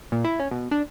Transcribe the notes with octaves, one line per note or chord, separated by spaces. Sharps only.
A#2
E4
C#4
B2
D4